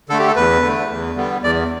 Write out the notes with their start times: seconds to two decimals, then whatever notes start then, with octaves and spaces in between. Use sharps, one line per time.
0.09 D3 A3 A4
0.19 G4
0.27 A4
0.36 E2 B4
0.63 D3 A3
0.90 E2
1.16 D3 G3 B3
1.42 E2 D5